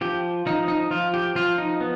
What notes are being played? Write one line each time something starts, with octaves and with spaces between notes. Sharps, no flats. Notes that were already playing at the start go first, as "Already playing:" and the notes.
F3 G4
F3 D#4
D#4
F3 F4
G4
F3 F4
D#4
B3